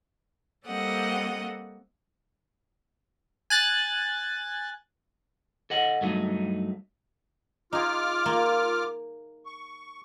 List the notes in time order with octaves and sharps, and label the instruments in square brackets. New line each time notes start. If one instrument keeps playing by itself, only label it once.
[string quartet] G3 A#3 C4 A4 D#5 F#5
[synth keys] G#5 F#6 A6
[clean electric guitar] A4 D#5 F#5
G2 F#3 A3 C#4 D#4
[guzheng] D#4 G#4 [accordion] F4 D6 F6
[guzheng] A#3
[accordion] C#6